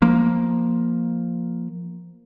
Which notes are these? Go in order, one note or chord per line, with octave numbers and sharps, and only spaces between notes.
F3 A#3